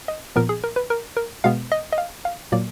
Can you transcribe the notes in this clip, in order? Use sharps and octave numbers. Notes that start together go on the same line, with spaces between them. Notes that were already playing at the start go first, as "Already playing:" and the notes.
D#5
A#2 F3 B3 A#4
G#4
A#4
B4
A#4
A#4
B2 G#3 B3 F5
D#5
D#5
F5
F5
A#2 F#3 A#3 D5